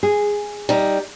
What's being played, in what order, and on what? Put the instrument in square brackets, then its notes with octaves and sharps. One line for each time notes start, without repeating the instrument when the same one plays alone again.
[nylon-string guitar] G#4
[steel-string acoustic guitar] G3 D#4